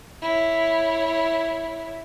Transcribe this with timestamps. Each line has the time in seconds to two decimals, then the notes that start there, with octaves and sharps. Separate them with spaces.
0.22 E4 C#5